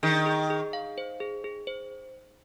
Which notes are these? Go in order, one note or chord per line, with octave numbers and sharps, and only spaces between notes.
D#3 G#4
G#4
G#4
F5
C5
G#4
G#4
C5